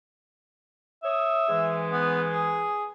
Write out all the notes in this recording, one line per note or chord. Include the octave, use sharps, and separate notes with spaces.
C#5 E5 D#6
G#2 E3 G#3
B3
G#4